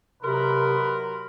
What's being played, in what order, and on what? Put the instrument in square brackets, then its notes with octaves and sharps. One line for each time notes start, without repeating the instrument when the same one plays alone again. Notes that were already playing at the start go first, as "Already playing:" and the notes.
[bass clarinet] C3 [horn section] F#3 A#4 [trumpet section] D#4 B4 B5 [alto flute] C6